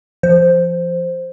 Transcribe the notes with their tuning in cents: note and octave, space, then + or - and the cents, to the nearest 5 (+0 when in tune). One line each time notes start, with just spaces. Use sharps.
F3 -25 C5 +0